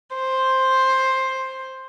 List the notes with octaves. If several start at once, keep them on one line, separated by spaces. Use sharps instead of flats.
C5